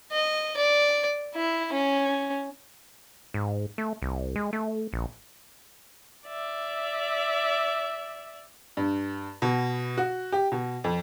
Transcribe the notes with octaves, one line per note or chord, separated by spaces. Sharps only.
D#5
D5
E4
C#4
G#2
A3
C2
G#3
A3
A#1
D5 E5
G2
B2
F#4
G4
B2
F2